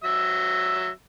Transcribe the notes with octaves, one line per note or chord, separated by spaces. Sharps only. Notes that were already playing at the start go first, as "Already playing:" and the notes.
F#3 E5 E6